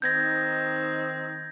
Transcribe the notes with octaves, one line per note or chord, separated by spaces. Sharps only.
D#3 C4 D#4 G6 G#6 A#6